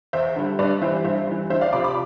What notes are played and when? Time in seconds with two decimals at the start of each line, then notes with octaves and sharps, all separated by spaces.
0.13 E2 C5 E5
0.36 D3 G3
0.59 G2 B4 D5
0.82 E3 G3 C5 E5
1.05 G2 C5 E5
1.27 E3 G3
1.50 D2 C5 E5
1.61 D5 F5
1.73 C3 F3 B5 D6
1.84 B5 D6